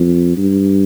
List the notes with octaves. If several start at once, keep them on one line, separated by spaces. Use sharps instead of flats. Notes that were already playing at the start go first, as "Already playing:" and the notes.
Already playing: F2
G2